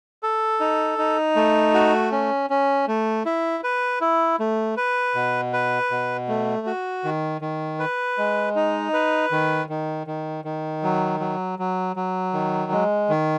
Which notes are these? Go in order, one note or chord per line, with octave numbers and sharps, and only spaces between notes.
A4
D#4
D#4
A3
F#4
C#4
C#4
A3
E4
B4
E4
A3
B4
B2
B4
B2
A3
F#4
D#3
D#3
B4
G#3
D#4
B4
D#3
D#3
D#3
D#3
F#3
F#3
F#3
F#3
D#3
G#3
D#3